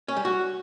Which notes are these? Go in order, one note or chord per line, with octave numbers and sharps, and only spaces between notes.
C#4
G3
F#4